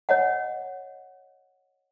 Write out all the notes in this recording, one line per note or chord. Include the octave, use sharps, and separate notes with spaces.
C#5 D#5 F#5